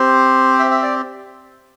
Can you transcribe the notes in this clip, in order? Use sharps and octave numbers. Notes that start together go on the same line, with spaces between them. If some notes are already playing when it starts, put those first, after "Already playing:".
Already playing: C4 G4 C5
E5
E5
D5